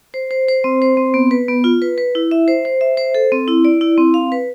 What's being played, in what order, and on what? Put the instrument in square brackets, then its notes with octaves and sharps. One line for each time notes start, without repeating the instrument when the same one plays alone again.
[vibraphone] C5
C5
C5
C4
C5
C4
B3
B4
B3
F4
B4
B4
E4
E5
C5
C5
E5
C5
A4
C4
E4
D5
E4
C4
F5
B4